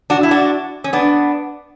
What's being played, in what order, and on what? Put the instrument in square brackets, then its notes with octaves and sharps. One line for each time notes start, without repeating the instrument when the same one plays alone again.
[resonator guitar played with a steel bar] D4 F#4
E4
D4 F#4
C#4
B3 D4